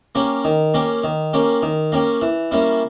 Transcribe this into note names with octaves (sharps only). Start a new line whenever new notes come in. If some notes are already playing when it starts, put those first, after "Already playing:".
A#3 C#4 G4
D#3
A#3 C#4 G4
D#3
A#3 C#4 G4
D#3
A#3 C#4 G4
E3
G3 A#3 C#4 E4